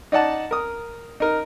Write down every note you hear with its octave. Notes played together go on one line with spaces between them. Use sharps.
D#4 D5 F#5 A5
A#4 D#6
D#4 A#4